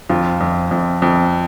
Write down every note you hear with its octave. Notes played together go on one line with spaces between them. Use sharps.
F2 F4
F2
F2
F2